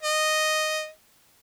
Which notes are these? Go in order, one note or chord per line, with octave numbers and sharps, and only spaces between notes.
D#5